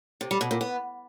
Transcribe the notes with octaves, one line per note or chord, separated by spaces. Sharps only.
C3
G3
B2
A#2
B3